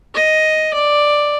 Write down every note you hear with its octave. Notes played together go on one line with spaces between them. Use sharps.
D#5
D5